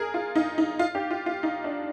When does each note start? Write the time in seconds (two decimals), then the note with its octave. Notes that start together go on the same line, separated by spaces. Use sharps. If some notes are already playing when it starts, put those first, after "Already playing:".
Already playing: G#4 A#4
0.14 F4
0.35 D#4
0.58 D#4
0.79 F4
0.95 G4
1.11 F4
1.26 F4
1.43 D#4
1.64 D4